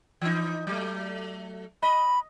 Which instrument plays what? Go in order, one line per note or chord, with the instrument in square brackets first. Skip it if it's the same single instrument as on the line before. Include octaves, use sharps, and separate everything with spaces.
[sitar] E3 D#4
F#3 A3
[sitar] D#5 [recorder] B5